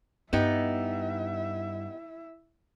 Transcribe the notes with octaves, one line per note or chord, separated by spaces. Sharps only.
G2 B3 D#4 E4 G4 E5